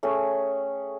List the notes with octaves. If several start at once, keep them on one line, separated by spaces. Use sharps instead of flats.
A3 C#4 G#4 G5